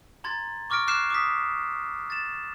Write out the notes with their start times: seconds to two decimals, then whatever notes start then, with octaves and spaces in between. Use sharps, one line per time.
0.24 A#5 C6 G#6 A6
0.70 C#6 D6 F6 A#6 D7
0.87 D6 F6 F#6 G#6 C7 E7
1.10 D6 D#6 B6
2.10 A6 E7